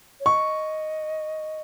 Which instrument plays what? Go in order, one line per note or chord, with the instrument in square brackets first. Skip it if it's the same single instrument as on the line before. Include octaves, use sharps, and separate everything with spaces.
[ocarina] C#5
[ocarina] D#5 [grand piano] C#6